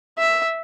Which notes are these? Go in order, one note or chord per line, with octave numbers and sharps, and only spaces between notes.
E5